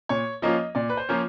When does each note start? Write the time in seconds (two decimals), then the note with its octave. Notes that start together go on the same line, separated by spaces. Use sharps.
0.09 A#2 C#5
0.42 F3 A#3 C#4 F4 D#5
0.75 A#2 D5
0.90 B4
0.97 C5
1.09 F3 A#3 C#4 F4